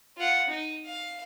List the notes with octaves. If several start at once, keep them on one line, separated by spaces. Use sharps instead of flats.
F4 F#5
D#4
F5